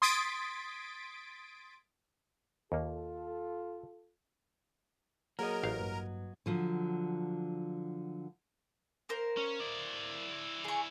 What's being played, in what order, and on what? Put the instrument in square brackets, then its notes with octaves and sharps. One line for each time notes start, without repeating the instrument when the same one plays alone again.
[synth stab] C6 D#6 G#6 A6 B6 D7
[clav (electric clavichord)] D#2 A#3 [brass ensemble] F4 A4
[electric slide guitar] F#3 C#5 D#5 [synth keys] A#3 G#4 [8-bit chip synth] A#4
[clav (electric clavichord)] A1 F5
[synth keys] G2 A#3 B4
[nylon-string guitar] D3 F3 F#3
[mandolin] A#3 A#4 C5
[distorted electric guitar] C#4
E4 D5
[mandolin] G#4 C#6